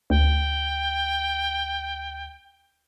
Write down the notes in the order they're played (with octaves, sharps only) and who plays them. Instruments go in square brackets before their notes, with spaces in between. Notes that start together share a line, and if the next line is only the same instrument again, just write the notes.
[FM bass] D2 [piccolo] G5